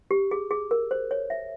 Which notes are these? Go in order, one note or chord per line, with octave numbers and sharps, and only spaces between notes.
G4
G#4
G#4
A#4
C5
C#5
E5